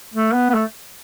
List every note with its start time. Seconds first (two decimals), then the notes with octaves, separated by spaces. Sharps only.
0.14 A3
0.34 B3
0.50 B3
0.54 A3